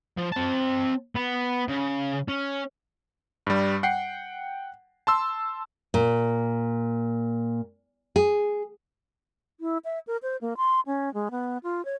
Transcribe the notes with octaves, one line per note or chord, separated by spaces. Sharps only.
F3
C4 A5
B3
C#3
C#4
G2 G3
F#5 G5 C7
A5 C6 E6
A#2
G#4
E4
E5
A#4
C5
A#3
C6
C#4
G#3
B3
F4
C#5